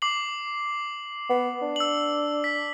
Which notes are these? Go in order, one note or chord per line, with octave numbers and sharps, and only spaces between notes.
D6 C7 F#7
B3
D4
E6 F#7
B6